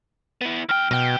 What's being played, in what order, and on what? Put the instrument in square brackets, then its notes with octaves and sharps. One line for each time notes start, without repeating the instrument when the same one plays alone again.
[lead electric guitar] B3 E4
[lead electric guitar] E2 G5 [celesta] F6
[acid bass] B2 [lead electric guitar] F#3 G5